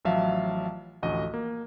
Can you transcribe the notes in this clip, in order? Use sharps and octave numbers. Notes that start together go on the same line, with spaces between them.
A1 F3 F#3 E5 F5 A5
A1 D2 F3 F#4 D#5
A#3